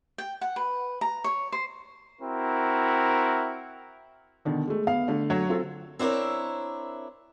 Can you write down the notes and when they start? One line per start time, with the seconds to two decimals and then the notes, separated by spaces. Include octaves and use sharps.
0.18 G5
0.41 F#5
0.56 B4
1.01 A#5
1.24 C#5
1.52 C5
2.21 C4 E4 F#4 A#4
4.45 B2 D3 D#3
4.67 G#3 A3
4.87 B3 F5
5.08 D3 A3
5.30 F#3 C#5
5.49 C4 F4 A4
5.99 C4 D4 E4 A#4 C#5